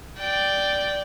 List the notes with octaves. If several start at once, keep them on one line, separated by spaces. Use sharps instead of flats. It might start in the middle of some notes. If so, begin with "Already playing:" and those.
D5 G5